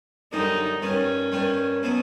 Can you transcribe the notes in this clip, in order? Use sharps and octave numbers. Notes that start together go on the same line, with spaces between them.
F#2 D3 G3 D#4
G2 D#3 G3 C#4
G2 D#3 G3
B2 F#3 B3